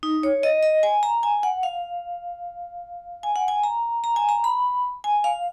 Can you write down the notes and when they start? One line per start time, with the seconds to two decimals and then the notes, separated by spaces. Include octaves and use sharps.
0.03 D#4
0.23 C#5
0.43 D#5
0.63 D#5
0.83 G#5
1.03 A#5
1.23 G#5
1.43 F#5
1.63 F5
3.23 G#5
3.36 F#5
3.48 G#5
3.63 A#5
4.04 A#5
4.16 G#5
4.29 A#5
4.44 B5
5.04 G#5
5.24 F5